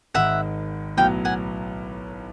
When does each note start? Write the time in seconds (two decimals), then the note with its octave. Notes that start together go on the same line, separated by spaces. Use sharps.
0.14 G#1 G#2 D#3 E5 F#5
0.97 B1 A2 F#3 B3 F5 G5
1.25 F#5 G#5